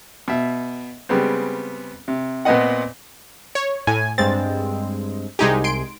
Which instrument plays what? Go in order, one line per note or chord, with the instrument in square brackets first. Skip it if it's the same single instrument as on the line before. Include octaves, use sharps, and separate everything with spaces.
[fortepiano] B2 E5
C#3 G3 G#3 B3 C4
C3
A#2 B3 C4 B4 D#5 F#5
[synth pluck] C#5
[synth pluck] A2 [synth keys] G#5
[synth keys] G2 G#3 C4 [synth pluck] A6
[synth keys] C2 G#5 [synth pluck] G#3 D#4 G4
[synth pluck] C6 D7